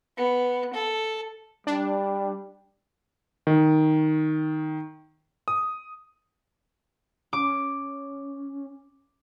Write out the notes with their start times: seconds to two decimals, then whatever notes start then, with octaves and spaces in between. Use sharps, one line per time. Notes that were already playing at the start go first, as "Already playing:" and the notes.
0.17 B3
0.74 A4
1.67 G3 D4
3.47 D#3
5.48 D#6
7.33 C#4 D6